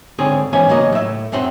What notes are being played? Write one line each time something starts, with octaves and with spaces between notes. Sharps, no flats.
G#2 D3 C4 G#4 C#5
G#2 E3 B3 C#4 G#5
C#2 F#3 A#3 C#5 D#5
A2 E5
F#2 C4 F#5 C6